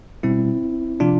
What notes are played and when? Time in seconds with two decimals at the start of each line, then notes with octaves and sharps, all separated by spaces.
0.23 B2 G3 C4 E4
1.00 C3 F3 D4 F4